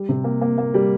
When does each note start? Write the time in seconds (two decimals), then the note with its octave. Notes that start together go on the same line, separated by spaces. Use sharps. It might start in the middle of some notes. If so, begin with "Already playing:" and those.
Already playing: G3
0.09 C3
0.24 A#3
0.41 A#3
0.58 A#3
0.74 G3